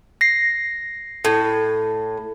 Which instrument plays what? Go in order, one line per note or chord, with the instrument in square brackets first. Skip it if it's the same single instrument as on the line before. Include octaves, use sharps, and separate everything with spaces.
[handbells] A#6 C7
[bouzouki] A2